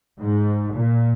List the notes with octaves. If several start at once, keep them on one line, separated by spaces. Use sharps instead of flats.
G#2
A#2